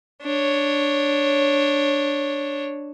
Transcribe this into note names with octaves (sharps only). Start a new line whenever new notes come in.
D4 C#5